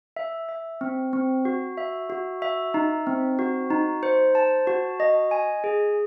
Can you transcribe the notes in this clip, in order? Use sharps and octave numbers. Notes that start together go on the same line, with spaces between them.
E5
E5
C4
C4
F#4
E5
F#4
E5
D#4
C4
F#4
D#4
C5
A5
F#4
D#5
G#5
G#4